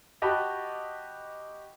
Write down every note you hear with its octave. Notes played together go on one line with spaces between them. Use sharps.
F#4 G4 D#5 A5 B5